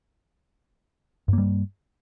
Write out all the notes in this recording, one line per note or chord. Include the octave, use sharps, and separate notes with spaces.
G2 G3 A#3